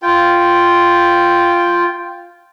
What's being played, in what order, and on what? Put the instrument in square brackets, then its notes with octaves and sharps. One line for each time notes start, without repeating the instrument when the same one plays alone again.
[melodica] F4 G5